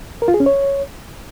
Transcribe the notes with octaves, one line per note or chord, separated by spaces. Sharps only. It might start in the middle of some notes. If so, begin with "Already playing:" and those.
A#4
F4
G#4
C#4
C#5